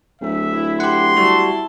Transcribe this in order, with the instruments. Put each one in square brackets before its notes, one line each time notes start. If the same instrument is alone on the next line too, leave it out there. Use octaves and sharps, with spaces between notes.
[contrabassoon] D1 [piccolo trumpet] E5
[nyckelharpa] E4
[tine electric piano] G4 F#5 [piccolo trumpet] C6
[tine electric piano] G3 F#4 [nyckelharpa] E4 A5